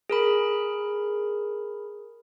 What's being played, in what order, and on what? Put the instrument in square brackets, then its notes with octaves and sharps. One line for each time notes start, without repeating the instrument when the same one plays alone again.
[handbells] G#4 A#4 B5